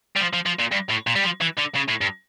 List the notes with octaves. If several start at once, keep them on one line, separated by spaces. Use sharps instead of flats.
G3
F3
F3
F3
A#2
G2
A2
A#2
G3
F3
E3
D3
C#3
A2
G2